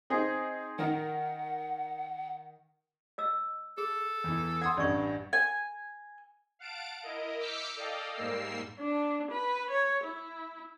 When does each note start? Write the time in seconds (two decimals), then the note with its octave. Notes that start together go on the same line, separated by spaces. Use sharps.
0.10 C4 D#4 G#4
0.79 D#3 A#4 F#5
3.18 D#5 E6
3.78 G#4 A4
4.24 E2 E3
4.62 F#5 C6 D#6 G#6
4.77 A1 G2 D5 D#5 C#6
5.33 G#5
6.59 F5 F#5 A5 D7
7.03 E4 A#4 D#5
7.39 D6 E6 F6 G6 B6 C#7
7.76 A4 D5 D#5 F5 G5
8.15 G#2 G3 A#3 A#4 E6 C7
8.80 D4
9.32 B4
9.70 C#5
10.04 E4